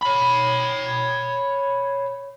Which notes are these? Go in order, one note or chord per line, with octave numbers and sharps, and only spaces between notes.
C#5 B5